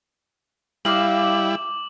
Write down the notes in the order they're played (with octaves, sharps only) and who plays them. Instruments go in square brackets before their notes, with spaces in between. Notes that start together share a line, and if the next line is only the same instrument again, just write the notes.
[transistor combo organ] G3 E4 [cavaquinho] D#5 F5 [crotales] D6 F#7